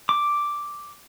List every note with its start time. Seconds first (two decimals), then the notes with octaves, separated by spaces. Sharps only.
0.09 D6